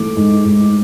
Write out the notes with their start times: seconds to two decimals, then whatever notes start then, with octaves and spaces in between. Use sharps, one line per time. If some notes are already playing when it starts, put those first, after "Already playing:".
Already playing: G#2 E3 A3 D6
0.17 G#2
0.45 G#2